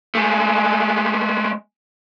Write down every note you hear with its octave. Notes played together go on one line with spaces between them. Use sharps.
G#3 A3